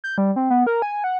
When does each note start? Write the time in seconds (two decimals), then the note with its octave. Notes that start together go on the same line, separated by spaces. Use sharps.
0.04 G6
0.18 G3
0.36 C4
0.50 B3
0.67 A#4
0.82 G#5
1.04 F#5